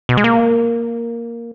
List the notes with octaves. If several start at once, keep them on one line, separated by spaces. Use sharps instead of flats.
B2
G#3
A#3